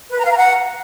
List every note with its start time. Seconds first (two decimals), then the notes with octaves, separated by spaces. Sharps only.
0.12 B4
0.18 A#5
0.25 F5
0.31 A#5
0.38 F#5